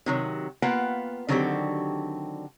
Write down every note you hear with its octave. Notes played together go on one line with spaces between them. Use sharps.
C3 D#3 F#3
A#3 B3 F4 F#5 G5
D3 D#3 F#3 C4 F#4 G4